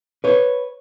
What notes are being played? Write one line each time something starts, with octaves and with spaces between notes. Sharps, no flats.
B4 C#5